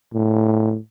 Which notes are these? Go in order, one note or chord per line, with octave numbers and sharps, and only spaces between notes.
A2